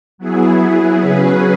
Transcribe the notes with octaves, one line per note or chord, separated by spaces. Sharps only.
F#3 B3 E4 G#4
C#3 F#3 C#4 G#4 B4